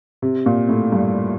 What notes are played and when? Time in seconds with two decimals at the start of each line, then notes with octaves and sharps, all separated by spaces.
0.22 C3
0.46 A#2
0.69 A2
0.92 G2